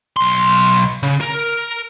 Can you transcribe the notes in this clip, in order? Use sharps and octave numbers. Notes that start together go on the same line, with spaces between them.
B1 C6
C#3
A#4